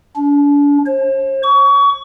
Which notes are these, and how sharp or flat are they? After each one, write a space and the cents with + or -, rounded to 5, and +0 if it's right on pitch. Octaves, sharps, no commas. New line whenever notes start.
D4 -40
C5 +45
C#6 +30